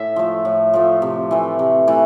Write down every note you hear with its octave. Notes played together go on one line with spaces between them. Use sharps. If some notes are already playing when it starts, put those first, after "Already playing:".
Already playing: A2 E5
F3 A3
A2
F3 A3
C3
E3 A3
C3
E3 A3